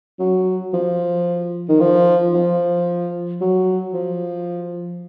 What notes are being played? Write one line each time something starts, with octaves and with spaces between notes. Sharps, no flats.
F#3
F3
D#3
F3
F3
F#3
F3